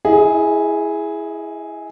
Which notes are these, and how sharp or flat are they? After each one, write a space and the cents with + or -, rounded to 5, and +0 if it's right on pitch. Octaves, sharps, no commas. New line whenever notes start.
E4 +0 G#4 +0 D#5 +35